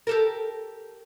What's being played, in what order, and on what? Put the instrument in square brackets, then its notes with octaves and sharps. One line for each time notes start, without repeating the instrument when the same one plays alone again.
[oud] G4 A4 A#4